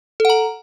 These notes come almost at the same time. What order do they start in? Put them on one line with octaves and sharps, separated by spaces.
A4 F#5 A#5